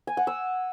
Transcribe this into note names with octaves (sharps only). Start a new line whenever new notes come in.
G#5
F#5
E6